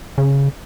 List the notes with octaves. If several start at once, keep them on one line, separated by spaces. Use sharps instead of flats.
C#3